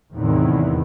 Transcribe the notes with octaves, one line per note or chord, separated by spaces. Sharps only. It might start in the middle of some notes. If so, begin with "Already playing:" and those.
E2 A2 C3 D#3 E3